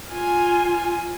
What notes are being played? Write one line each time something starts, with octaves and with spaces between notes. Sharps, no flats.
F4 G#5